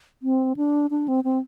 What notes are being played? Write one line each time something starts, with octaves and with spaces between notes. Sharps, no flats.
C4
D4
D4
C4
C4